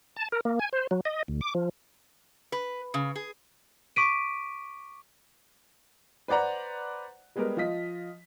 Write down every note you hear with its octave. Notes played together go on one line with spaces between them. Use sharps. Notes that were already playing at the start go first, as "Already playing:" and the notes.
A5
A#4
A#3
G#5
C5
F#3
D#5
D2
D6
F3
B4
C#3
G#4
C#6 D6 B6 D7 D#7
B4 C5 D5 F#5 A#5
G3 G#3 B3 G4 A#4
F3 F4 D#5 B6